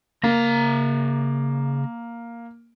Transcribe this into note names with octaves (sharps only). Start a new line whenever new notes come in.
C#3 A#3 A#5